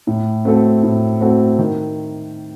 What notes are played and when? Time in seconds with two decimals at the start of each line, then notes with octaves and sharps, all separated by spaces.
0.07 A2
0.45 A3 C4 F#4 A4
0.83 A2
1.20 A3 C4 F#4 A4
1.59 D#3